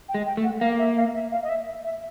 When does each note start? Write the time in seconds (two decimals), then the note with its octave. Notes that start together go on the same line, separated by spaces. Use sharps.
0.09 G5
0.14 G#3
0.26 G5
0.37 A3
0.44 F#5
0.61 A#3 F5
0.79 E5
0.96 F5
1.14 E5
1.32 F5
1.43 D#5
1.49 E5
1.84 E5